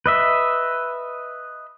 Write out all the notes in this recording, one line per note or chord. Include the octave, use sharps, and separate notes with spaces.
B4 D#5 E5